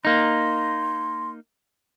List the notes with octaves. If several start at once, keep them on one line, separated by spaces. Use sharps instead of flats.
A#3 D#4 C6